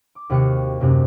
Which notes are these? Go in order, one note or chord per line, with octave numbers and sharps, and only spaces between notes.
D6
D#2 C3 F#4 F5 C#6 C#7
F#2 C3 A#3 C4 C#4